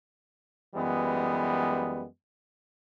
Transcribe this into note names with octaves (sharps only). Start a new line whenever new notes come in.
F#2 E3 G3 G#3 B3